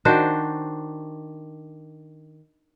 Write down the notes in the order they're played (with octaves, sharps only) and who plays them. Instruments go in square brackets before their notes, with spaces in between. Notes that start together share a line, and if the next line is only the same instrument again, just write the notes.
[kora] D#3 D4 F#4 C5